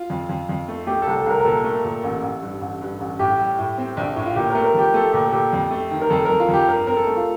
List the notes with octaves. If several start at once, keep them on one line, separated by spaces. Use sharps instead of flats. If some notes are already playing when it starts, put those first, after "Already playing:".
Already playing: F4
F2
F2
F2
A3
A3 G4
C2 A4
A4
C2 A#4
A#4
A#2 A4
A3
A#2
A1
A1
G2
A1
G2
A1
A2 G4
G3
A2
C4
A#1
A2
F4
A#2 G4
A3 A#4
A#4
F3 G4
A3 A4
A#2 G4
A4
A#2 G4
F2
A3
D#3
A#4
F2 A4
F2 A#4
F4
F2 G4
G2 A#4
C4 A#4
A4
A3
F4